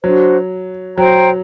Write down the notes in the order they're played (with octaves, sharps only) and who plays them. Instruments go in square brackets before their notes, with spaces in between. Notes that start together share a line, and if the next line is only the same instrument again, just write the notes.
[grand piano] F#3 [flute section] D4 F#4 C5
[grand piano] F#3 [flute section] C5 G5 A#5